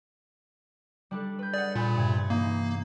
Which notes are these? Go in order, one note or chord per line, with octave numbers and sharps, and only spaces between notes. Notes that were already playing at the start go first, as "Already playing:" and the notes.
G3 D4 A4
B4 G6
G#4 D5 F#5
A#2 G#4 G#5 B5
G2 C3 G#6
E3 A#3 D#4